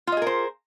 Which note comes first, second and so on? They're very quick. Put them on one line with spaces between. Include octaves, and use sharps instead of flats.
F4 D#5 G#4 A#4 C5